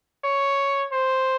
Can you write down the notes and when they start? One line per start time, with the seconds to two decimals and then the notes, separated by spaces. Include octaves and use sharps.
0.24 C#5
0.92 C5